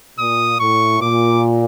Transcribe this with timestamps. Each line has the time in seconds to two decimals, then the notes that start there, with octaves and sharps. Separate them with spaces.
0.19 A#2 D#6
0.60 A2 C#6
1.01 A#2 D6